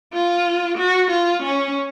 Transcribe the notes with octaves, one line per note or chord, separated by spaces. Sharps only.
F4
F#4
F4
C#4